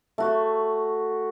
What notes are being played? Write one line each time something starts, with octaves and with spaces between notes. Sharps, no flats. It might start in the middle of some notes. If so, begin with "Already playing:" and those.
A3 F#4